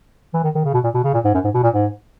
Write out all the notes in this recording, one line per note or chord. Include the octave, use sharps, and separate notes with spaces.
E3
D#3
D#3
C#3
B2
A#2
B2
C#3
A#2
G#2
F#2
G#2
B2
A#2
G#2